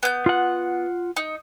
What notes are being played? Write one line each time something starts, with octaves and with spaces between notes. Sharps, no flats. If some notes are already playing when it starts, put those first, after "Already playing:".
B3 G6
F4 F#5
D#4